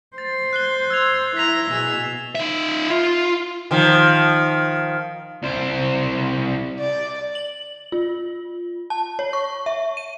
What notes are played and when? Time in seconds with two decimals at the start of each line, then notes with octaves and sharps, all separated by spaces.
0.18 C5 A6
0.53 F#6 C7 G7
0.90 E6 G#6 F7
1.37 E4 A#5 A#6 B6 F7
1.71 B2 G#4 E6
2.35 D#4 E5
2.90 F4
3.71 D#3 F3
5.43 C2 C5
6.80 D5
7.35 F#7
7.92 F4
8.90 A5
9.19 C#5
9.33 C#6
9.66 E5
9.97 D#7